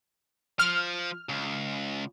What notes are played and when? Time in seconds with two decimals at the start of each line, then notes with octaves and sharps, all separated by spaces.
0.59 F3 F6
1.29 C#2